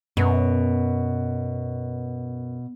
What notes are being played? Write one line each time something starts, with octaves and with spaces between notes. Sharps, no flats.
F#2 B2